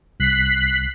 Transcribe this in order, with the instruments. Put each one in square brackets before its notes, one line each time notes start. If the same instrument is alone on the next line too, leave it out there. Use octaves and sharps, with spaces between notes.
[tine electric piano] C2 [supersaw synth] F#6 B6 C7